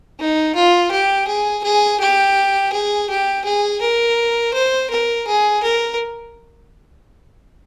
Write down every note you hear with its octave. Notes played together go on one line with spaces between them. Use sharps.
D#4
F4
G4
G#4
G#4
G4
G#4
G4
G#4
A#4
C5
A#4
G#4
A#4